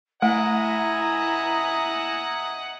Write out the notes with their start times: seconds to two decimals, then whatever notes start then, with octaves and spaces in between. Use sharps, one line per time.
0.22 A3 E4 D#5 E5 F#5 G#5 A#5